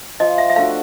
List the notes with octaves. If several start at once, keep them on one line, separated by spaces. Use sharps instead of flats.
F3 D#5
E5
E5
A3 D4 F#4 F5